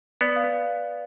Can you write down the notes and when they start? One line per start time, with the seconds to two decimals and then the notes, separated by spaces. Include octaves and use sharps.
0.21 B3 B4 D5
0.36 F5